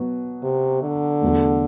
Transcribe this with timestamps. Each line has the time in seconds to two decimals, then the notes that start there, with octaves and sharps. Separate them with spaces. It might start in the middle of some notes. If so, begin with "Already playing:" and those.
Already playing: B2 F#3 B3
0.43 C3
0.82 D3
1.22 E2 B2 F#3 A3